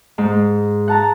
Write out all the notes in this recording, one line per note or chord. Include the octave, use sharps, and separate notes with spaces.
G#2
F#5 A5 A#5